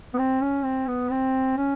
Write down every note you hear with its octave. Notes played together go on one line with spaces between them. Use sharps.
B3
C4
C#4
C4
B3
C4
C#4